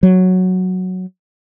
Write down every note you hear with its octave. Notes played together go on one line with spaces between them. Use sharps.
F#3